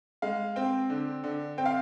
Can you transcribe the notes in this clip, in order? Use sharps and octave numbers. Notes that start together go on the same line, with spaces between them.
G#3 F5
C4 G5
D3
D3
C4 G5
F5